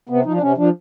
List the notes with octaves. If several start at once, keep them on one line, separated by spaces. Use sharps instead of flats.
C3 B3
F3 D#4
D4
C3 C#4
F3 D4